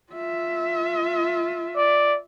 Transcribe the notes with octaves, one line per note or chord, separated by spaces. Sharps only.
F4 E5
D5